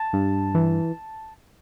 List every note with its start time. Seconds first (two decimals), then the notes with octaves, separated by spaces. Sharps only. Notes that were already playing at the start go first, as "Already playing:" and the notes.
Already playing: A5
0.13 G2
0.55 E3